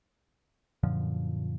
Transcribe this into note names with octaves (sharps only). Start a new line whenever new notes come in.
F#2 A#2 D3 F3